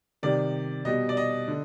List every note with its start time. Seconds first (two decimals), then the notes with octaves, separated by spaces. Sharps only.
0.23 C3 D#3 G3 D5
0.85 B2 G3 D#5
1.09 D5
1.17 D#5
1.48 D3